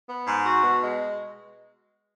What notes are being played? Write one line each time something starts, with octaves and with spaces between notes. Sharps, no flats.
B3
G#2
F#4
B2
G#3